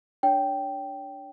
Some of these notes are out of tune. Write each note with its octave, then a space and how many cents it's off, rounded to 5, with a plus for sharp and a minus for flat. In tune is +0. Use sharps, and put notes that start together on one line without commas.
D4 +0 C#5 +25 G5 -5